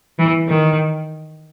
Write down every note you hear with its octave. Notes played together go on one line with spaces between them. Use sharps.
E3
D#3